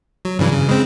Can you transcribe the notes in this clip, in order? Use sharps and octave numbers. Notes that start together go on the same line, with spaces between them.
F#3
G2 C#3 E3
C#3
G#3 C4